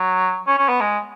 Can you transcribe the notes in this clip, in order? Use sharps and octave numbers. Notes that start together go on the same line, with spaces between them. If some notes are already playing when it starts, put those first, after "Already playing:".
Already playing: F#3
C#4
C#4
B3
G#3